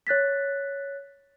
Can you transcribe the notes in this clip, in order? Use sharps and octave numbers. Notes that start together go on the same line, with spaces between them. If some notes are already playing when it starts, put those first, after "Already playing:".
C#5 F#6 A6 B6